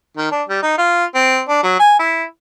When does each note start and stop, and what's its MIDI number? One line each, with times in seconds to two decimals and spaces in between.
0.17 0.29 51
0.31 0.42 62
0.49 0.61 55
0.63 0.74 63
0.78 1.05 65
1.15 1.41 60
1.49 1.60 62
1.63 1.76 54
1.79 1.95 80
1.99 2.24 64